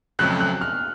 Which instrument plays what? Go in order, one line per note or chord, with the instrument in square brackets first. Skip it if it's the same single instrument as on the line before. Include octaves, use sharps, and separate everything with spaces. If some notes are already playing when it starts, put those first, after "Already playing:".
[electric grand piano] F2 C#3 F#3 A3 C4 [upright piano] F#6
[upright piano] F#6
F6